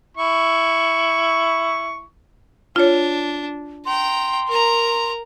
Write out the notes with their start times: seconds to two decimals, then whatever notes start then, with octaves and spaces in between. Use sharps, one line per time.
0.17 E4 C#6
2.76 D4 F4 C#5
3.85 G5 A#5 C6
4.48 A#4 A#5